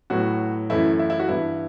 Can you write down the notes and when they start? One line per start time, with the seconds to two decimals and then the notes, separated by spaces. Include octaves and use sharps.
0.10 A2 F#3 B3 F#4
0.70 F#2 E3 A3 E4
0.99 E4
1.10 E4
1.20 F#4
1.29 G2 E3 B3 E4